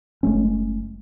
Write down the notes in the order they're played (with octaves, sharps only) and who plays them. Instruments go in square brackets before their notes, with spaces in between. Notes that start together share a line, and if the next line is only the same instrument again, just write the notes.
[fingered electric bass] F#1 G#3 A3 C#4